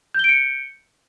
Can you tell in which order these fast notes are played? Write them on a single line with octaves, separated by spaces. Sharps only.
G6 G7 D7 C#7